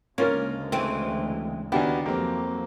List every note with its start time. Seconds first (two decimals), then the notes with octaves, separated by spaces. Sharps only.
0.18 D2 C#3 G#3 A#3 C#4 F4 A#4
0.72 E3 A3 C4
1.72 D#2 B3 D4 E4 F#4 G4 G#5
2.06 F2 F#3 A#3 C4 G4